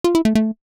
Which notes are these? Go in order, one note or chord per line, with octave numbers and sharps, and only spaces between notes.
F4
E4
A3
A3